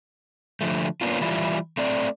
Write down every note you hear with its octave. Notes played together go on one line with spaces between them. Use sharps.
D3 F3 A3
A#3 B3 C#4 D4 F4
E3 G3 E4 F4
A3 C4 D5